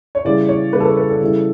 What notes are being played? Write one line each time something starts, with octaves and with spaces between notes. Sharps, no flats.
C#5
C#3 E3 G3 D5
C#5
C#3 E3 G3 B4
A4
B4
B4
A4
C#3 E3 G3